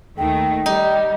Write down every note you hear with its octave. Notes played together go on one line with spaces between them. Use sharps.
D#2 D#3 A3 G5
G3 D#4